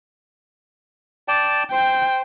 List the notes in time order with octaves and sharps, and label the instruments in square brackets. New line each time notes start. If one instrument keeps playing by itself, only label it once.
[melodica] D5 G5 A5
[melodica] C5 [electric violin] G5